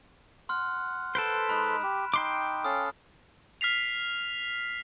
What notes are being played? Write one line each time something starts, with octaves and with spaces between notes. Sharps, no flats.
F#5 C6 F6
A4 B4 C5 B6 D7 E7
G#3 D#4 B5 F#6
G4
D#4 G5 C6 D6
C#4 A4 F5 D#6
F6 B6 C7 F7